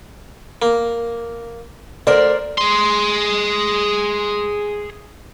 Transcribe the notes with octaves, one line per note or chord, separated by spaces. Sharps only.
A#3
D2 A#4 C5 D5
G#4 C6